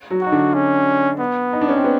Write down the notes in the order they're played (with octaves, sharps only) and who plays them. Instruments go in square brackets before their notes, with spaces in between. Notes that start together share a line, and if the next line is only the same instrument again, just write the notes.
[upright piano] F#3 F#4
[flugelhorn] F#4
[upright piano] D#4
D3 D4
[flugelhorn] C#4
B3
[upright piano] D#4
D4
C#4
C4
B3